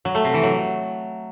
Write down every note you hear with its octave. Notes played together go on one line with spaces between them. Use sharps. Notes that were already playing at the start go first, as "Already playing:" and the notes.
F#3
A3
C3
E3
F#3